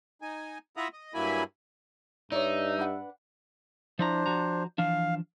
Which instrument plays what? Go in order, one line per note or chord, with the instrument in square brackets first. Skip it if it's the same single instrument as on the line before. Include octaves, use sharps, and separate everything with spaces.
[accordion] D#4 G#5
E4 F4 E5 F#5 A#5 D#6
D#5
G2 F#3 A#3 E4 G#5 B5
[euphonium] G2 [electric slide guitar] D#4 [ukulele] C#5 D5 [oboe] E5
[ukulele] D4 B4 F#5
[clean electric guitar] F3 E4 A#5 [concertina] D4 C5
[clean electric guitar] F3 F#4 A#5
[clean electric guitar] E3 F3 D4 [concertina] F5